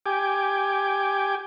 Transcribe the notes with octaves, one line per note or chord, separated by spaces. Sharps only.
G4 G5 G#5 D6